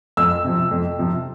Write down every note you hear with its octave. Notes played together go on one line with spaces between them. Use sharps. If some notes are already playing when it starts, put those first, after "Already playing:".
F2 E6
C3 F3
F2
C3 F3